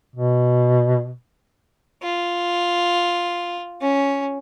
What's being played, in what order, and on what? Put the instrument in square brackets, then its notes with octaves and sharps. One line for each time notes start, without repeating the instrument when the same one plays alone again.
[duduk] B2
[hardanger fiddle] F4
C#4